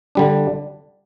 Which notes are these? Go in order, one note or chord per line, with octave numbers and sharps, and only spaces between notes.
D3 G3 D4